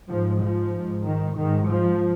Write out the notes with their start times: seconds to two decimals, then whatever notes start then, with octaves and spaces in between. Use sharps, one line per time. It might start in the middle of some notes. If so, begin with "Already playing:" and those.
0.09 G#2 F3
0.40 F3
0.73 G#2
1.05 D#3
1.37 G#2 D#3
1.69 F3